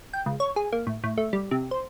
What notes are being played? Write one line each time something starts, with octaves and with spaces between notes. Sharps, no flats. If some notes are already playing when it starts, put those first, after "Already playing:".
G5
C#2
C#5
G#4
A#3
A2
A2
A3
G3
C3
C5